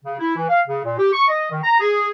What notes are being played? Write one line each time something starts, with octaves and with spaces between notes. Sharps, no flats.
C#3
E4
E3
F5
C#3
A#2
G4
C#6
D#5
D#3
A#5
G#4